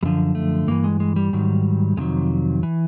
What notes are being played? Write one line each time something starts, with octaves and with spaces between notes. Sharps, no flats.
F#2 D3 F3 G3
A3
G2 E3 A#3
G#3
G#3
G3
G#2 D#3 F#3
F2 C3 D#3 F#3 G#3
E3